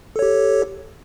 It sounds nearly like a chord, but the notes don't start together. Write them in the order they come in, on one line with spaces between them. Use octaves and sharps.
A4 C#5 G4